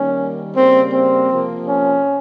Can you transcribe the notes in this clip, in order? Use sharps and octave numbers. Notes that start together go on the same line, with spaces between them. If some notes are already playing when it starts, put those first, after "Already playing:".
Already playing: D#3 G3 A#3 C#4
C#3 G3 A#3 C4
C4
C3 F3 A#3
C#4